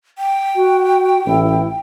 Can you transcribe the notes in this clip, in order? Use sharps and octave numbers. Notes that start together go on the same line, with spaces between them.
G5
F#4
A1 E4